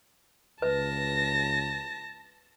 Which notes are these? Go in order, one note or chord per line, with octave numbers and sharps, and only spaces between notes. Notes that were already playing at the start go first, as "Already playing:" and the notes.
C#2 B4 A5 A#6